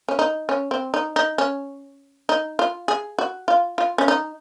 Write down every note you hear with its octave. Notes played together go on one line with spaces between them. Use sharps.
C#4
D#4
C#4
C4
D#4
D#4
C#4
D#4
F4
G#4
F#4
F4
F4
C#4
D#4